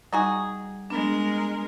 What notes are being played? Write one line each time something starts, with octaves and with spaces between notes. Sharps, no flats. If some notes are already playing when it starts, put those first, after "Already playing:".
G3 D#4 F#4 G#4
G#3 B3 D4 A#4